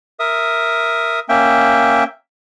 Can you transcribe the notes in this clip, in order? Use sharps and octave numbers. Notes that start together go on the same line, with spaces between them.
A#4 E5 D#6
A#3 C#4 E5 G5